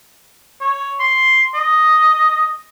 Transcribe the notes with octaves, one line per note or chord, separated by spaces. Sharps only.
C#5
C6
D#5